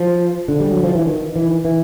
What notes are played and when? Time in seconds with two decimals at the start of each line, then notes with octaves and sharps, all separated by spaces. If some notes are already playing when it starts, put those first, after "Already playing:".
Already playing: F3
0.48 D3
0.60 G3
0.71 F#3
0.83 F3
0.95 E3
1.06 D#3
1.36 E3
1.65 E3